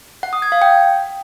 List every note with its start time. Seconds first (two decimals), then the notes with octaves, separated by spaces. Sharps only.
0.23 F#5
0.33 D#6
0.42 G#6
0.52 F5
0.62 G5